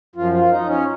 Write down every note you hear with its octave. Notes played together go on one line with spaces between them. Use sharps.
F#2 F3 F4
F4
D#4
C#4